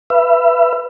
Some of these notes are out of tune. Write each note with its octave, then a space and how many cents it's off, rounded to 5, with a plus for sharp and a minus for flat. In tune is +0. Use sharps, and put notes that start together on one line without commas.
B4 +0 E5 +35